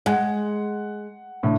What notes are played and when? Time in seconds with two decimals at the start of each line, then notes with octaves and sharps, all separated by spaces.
0.06 G#3 F#5
1.43 A2 D3